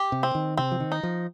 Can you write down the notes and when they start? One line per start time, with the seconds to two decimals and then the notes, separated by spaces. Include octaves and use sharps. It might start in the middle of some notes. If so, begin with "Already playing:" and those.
Already playing: G4
0.12 C3
0.23 C4
0.35 D#3
0.57 C3 C4
0.72 F3
0.80 D#3
0.92 D#4
1.03 F3